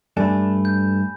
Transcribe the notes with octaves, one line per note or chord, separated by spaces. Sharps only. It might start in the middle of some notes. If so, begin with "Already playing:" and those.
G2 A3 D4 G#5 B5
G6